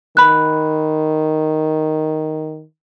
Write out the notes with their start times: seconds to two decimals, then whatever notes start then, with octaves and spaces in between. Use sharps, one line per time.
0.17 D#3 B5 F#6